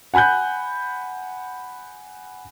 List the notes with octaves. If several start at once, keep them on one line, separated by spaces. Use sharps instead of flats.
F#5 G#5 B5 F#6 G6